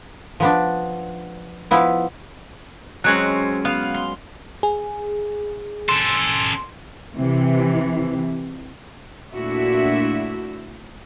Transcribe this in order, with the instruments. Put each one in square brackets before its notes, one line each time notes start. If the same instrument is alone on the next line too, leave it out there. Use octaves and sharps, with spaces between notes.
[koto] F3 B3 D4
F3 B3 E4
[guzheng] F#3 G#3 C#4 [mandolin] C4 C#5 F#6
[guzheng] B3 [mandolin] F5
[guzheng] C6
[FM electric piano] G#4
[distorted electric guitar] C#4 A4 [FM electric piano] C6
[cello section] C3 E3
A#2 A3 D4 E4 F#4 E5